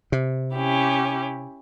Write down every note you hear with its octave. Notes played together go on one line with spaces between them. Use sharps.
C3
C#4 E4 G4